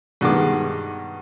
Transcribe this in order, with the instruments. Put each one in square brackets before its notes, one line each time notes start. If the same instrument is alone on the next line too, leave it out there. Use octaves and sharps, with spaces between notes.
[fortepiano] G2 B2 D#3 G#3 D6